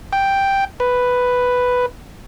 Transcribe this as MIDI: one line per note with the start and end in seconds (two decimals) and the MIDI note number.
0.13 0.65 79
0.80 1.86 71